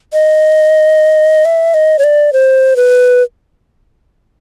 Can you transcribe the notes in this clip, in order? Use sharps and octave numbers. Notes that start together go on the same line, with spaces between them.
D#5
E5
D#5
C#5
D5
C5
B4